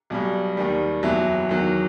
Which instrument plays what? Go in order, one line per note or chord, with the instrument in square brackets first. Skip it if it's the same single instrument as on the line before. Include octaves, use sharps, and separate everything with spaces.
[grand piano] B1 B2 G3
D#2 D#3 G3
F#1 E2 B2 F#3 E5
E2 D#3 F#3